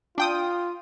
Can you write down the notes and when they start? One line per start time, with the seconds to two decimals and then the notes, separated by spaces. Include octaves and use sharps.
0.18 D4 F4 G5 D#6